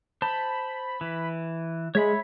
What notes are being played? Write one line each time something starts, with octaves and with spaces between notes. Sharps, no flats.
C5 A5 B5
E3
G#3 C#5 E5 B5